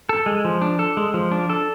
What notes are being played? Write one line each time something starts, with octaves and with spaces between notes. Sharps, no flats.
A4
G#3
F3
D4
A4
G#3
F3
D4
A4